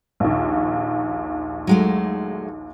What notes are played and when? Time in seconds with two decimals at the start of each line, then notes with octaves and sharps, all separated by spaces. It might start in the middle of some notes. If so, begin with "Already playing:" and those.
0.20 A#1 D#2
1.67 F#3 G#3 A3